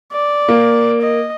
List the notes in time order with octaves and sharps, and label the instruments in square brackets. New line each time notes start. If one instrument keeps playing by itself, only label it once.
[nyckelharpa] D5
[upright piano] A#3
[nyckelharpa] D#5